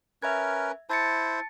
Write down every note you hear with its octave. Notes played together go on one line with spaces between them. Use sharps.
C#4 A#4 B4 E5 G#6
E4 C5 A5 A6 C#7